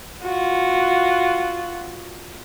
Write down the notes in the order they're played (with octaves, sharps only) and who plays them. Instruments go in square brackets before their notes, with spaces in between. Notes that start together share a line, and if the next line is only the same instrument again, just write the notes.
[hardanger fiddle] F4 F#4